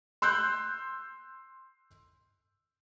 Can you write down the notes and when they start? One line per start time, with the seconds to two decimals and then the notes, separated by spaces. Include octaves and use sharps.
0.22 C6 E6 F#6 G6